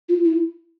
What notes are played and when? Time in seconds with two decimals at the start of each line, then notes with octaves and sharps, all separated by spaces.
0.09 F4
0.24 E4